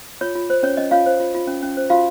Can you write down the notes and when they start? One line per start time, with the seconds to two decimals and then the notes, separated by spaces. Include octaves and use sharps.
0.21 F4 C#5
0.35 F4
0.50 C5
0.63 C#4 C#5
0.77 C#4 D#5
0.91 F4 C#5 F5
1.06 C5
1.20 F4
1.35 F4
1.48 C#4
1.63 C#4
1.77 C5
1.90 F4 F#4 F5